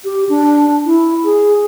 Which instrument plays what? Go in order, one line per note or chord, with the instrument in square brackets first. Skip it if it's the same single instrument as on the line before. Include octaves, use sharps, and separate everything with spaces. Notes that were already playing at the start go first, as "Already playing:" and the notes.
[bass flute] G4
D4
E4
G#4